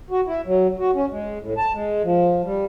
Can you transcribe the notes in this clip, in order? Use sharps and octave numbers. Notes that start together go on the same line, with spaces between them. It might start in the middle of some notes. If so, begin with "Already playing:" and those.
F#4
E4
F#3
F#4
C#4
G#3
A2
A5
G#3
F3
G3